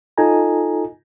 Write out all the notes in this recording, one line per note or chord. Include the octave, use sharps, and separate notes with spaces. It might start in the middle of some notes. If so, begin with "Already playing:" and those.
D#4 F4 A4 D#5 G#5 A#5